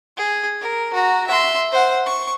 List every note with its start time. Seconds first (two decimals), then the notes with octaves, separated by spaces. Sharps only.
0.17 G#4
0.60 A#4
0.93 F#4 A#5
1.27 E5 C6
1.72 C5 F#5
2.06 C#6